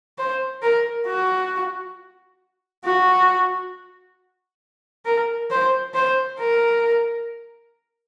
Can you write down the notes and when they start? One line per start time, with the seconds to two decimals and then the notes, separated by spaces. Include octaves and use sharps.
0.18 C5
0.62 A#4
1.07 F#4
2.85 F#4
5.05 A#4
5.51 C5
5.94 C5
6.39 A#4